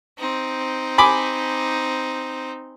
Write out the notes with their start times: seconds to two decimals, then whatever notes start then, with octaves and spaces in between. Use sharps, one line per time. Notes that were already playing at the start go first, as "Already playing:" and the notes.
0.18 C4 D#4
0.98 G#5 B5 D6